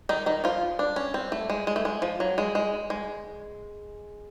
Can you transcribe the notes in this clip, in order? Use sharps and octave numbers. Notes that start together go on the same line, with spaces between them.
D#3 D#4
D#3 D#4
F3 F4
D4
C#4
C4
A3
G#3
G#3
A3
G#3
F3
F#3
G#3
G#3
G#3